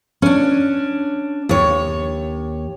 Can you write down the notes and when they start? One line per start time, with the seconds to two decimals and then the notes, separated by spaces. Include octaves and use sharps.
0.22 C#4 D4
1.49 D#2 C#5